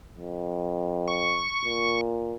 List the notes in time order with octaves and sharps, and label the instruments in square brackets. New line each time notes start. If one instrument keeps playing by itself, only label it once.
[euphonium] F2
[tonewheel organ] C#6
[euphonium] A#2